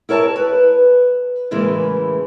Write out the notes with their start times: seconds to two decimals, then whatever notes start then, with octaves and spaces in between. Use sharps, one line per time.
0.09 E4 A#4 C#5 A5
0.36 B4
1.51 A2 C#3 E3 G#3 A#3